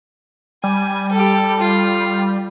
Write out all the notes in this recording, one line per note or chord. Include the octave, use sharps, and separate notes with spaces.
G3 G#5
G4 A4
F4